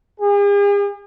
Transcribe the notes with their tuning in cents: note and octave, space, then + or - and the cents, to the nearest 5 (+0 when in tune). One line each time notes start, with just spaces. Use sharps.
G#4 -45